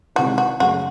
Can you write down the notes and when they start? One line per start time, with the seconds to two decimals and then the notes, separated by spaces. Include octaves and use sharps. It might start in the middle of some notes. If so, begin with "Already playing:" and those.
0.15 C3 D#3 G#3 C4 E4 F#4
0.38 F#4
0.60 F#2 C#3 F#3 A3 F#4